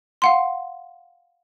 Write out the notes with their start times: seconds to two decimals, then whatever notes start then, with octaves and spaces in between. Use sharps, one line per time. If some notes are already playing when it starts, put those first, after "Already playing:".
0.22 F5 F#5 C6